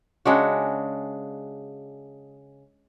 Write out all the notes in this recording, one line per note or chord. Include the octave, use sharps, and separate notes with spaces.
C#3 G#3 D4 F#4